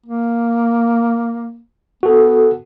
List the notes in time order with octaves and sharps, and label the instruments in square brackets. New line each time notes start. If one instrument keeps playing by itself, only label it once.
[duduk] A#3
[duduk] B3 [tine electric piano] F#4 A4